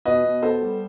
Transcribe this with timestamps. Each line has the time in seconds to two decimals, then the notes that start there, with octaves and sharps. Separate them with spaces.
0.05 B2 B4 D#5
0.24 B2
0.42 B3 A4 C5
0.62 G3